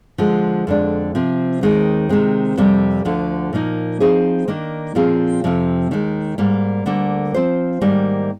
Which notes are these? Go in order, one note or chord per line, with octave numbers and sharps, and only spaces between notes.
D3 F3 G#3
F2 D3 G#3 D4
C3 F3 C4
D#2 D#3 G#3 C4
C3 D#3 G#3 C4
F2 C3 G3 A#3
D2 D3 F3
A#2 F3 A#3 D#4
F3 C4 D#4 G#4 C5
D#3 A#3 D4
A#2 F3 C4 F4 G#4
F2 C3 F3
D#2 D#3 G#3
G#2 G3 A#3
D2 D3 G3 A#3
F3 C4 F4 C5
G#2 D#3 G3 A#3